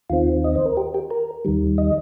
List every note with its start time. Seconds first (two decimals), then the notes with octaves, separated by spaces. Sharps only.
0.10 D#2 D#3 C4 F4
0.44 D#5
0.55 C5
0.66 A#4
0.77 G4
0.94 G4
1.11 A#4
1.45 D#2 D#3 G3
1.78 D#5